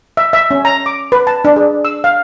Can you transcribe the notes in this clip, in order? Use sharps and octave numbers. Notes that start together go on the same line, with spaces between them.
E5
E5
C#4
A#5
D6
B4
A5
D4
G#4
E6
F5